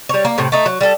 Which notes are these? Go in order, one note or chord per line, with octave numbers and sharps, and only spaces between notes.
G3 C#5
A#3
A2 C3
A3 D#4
F#3
G3 A4